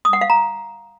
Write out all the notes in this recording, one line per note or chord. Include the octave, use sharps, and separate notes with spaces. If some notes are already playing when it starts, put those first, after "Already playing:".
D#6
F#5
F5
A#5